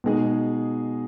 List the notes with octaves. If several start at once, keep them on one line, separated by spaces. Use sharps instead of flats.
B2 G#3 D#4 G#4